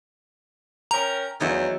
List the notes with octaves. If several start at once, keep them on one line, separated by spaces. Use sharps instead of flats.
C#4 A#4 G5 A#5
E2 F#3 A3 D#4 E5